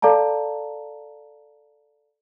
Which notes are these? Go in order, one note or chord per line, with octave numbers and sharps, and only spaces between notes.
A4 D5 F5 A5 A#5